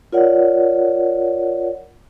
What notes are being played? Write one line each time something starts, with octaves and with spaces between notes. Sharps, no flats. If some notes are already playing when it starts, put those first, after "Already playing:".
F4 A#4 C#5 D5 F#5